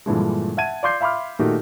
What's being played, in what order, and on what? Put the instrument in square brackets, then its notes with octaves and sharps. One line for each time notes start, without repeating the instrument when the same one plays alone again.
[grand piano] G2 A#2 D3 E3 F3 G#3
E5 F#5 A5 G#6 D#7
D5 F5 C6 D6 G6 C7
E5 F5 B5 C6 D6 F6
A#2 D#3 A3 D#4 F#4 G4